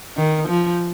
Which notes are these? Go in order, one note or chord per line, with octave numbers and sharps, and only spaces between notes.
D#3
F3